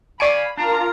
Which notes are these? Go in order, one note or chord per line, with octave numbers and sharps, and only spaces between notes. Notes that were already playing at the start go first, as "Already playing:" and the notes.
D5 F5 G#5 B5 C#6 D7
D4 F4 A#4 F5 A#5